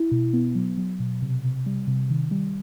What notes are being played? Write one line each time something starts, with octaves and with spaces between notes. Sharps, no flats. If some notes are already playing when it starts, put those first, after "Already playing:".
Already playing: E4
B2
B3
F#3
F#3
B2
C3
C3
G3
C3
D#3
G3